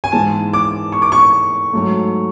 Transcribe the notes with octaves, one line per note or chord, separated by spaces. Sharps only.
G#5
G#2 E3 G#3 A5
D6
C#6
D6
C#6
G#2 F#3 A3